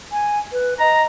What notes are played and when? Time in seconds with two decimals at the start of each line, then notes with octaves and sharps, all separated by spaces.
0.12 G#5
0.52 B4
0.80 D#5 A#5